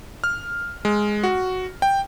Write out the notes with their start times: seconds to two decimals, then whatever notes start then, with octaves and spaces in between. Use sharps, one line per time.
0.24 F6
0.85 G#3
1.23 F#4
1.82 G5